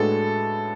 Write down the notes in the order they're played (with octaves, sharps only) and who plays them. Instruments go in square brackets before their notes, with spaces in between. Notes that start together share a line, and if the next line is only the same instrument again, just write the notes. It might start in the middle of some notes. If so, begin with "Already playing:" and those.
Already playing: [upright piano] A2 G#3 D4 F#4 B4 [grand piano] A4